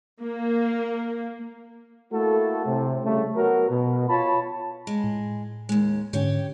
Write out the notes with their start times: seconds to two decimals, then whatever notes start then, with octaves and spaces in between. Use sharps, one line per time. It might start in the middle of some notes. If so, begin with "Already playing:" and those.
0.22 A#3
2.12 A3 A#3 E4 F#4 A4
2.66 A2 C3
3.04 C#3 G3 A3
3.36 F#3 B3 F#4 A#4
3.70 B2
4.09 F4 C#5 A5 B5
4.87 G#3
5.04 A2
5.69 D#2 G#3
6.13 G#2 D3 C#4 G4 C#5 G5